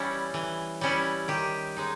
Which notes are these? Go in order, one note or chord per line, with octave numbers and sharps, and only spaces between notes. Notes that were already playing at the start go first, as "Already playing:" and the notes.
Already playing: E3 G3 C#4 E4
E3
G3 C#4 E4
D#3 G4
G#3 D#4